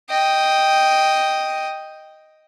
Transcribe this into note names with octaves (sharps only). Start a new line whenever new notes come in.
D#5 G5